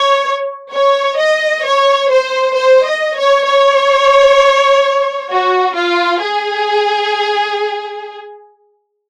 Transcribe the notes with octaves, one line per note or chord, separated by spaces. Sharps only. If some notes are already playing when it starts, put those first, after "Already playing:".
Already playing: C#5
C#5
D#5
C#5
C5
C5
D#5
C#5
C#5
F#4
F4
G#4